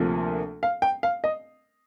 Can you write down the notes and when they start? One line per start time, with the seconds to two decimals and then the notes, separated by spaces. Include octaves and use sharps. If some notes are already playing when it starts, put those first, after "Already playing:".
Already playing: D2 C3 F3 A#3
0.63 F5
0.82 G5
1.03 F5
1.24 D#5